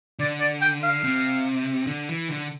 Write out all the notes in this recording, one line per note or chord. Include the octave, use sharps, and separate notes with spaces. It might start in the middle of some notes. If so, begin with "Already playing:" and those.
D3 D5
D5
G5
F5
C3
D3
E3
D3